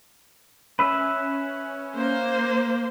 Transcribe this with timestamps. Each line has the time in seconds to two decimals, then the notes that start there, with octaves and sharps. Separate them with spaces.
0.79 C#4 B4 E5 B5
1.96 A#3 C5